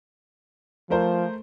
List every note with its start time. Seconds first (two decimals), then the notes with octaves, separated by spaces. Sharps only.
0.90 F3 A3 A#4 C5